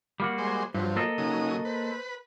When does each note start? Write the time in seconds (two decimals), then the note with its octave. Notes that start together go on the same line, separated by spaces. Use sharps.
0.20 G3 A#3 F#4
0.38 G#3 C5
0.74 G2 F3 F#3 C5
0.96 A#3 A4 D#5
1.18 C#3 F#3 D#4 D#6
1.65 B4 C5